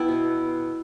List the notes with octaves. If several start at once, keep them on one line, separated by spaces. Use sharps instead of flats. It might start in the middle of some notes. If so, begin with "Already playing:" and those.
Already playing: B3 E4 G5 A5
B2